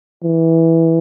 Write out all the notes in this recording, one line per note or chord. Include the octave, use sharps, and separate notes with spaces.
E3